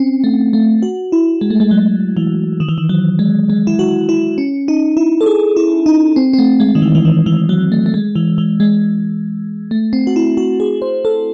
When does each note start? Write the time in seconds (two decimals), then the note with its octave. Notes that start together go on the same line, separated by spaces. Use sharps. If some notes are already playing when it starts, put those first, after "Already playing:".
Already playing: C4 C#4
0.24 A3
0.53 A3
0.83 F#4
1.12 E4
1.41 G#3
1.50 A3
1.60 G#3
1.71 F#3
2.17 E3
2.60 D#3
2.69 E3
2.78 D#3
2.89 F#3
3.19 G#3
3.50 G#3
3.67 E4
3.79 F#4
4.09 E4
4.38 C#4
4.68 D#4
4.97 E4
5.21 A4
5.26 G#4
5.57 E4
5.86 D#4
6.16 C4
6.33 C4
6.38 A3
6.60 G#3
6.75 D#3
6.82 E3
6.95 E3
7.05 D#3
7.26 E3
7.49 F#3
7.72 A3
7.86 A3
7.94 G#3
8.15 E3
8.38 E3
8.60 G#3
9.71 A3
9.93 C4
10.07 F#4
10.16 E4
10.37 F#4
10.60 G#4
10.82 C5
11.05 A4